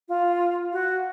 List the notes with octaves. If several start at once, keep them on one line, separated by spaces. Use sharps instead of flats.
F4
F#4